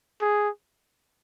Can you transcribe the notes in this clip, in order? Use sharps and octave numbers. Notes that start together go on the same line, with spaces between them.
G#4